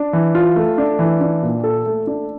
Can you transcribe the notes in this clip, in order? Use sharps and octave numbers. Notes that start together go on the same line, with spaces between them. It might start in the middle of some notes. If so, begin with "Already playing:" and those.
Already playing: D4
E3
F4
A3
D4
E3
D4
A#2
A4
A3
D4